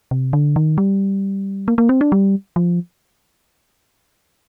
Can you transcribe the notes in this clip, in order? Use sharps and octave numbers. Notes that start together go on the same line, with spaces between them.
C3
D3
D#3
G3
A#3
A#3
C4
D4
G3
F3